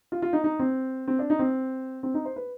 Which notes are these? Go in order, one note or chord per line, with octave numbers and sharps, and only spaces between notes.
F4
F4
D#4
D#4
C4
C4
D4
D#4
C4
C4
D#4
C5
B4